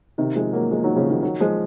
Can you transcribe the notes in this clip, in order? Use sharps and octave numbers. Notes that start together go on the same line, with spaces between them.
C3 D#3
F3 G#3
F#3 A#3
F3 G#3
D#3 F#3
C#3 F3
D#3 F#3
D#3 F#3
F3 G#3